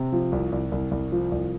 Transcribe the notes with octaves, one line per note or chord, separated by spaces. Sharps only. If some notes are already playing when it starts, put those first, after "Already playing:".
Already playing: C3
F3
C2
C2
C2
C2
F3
C2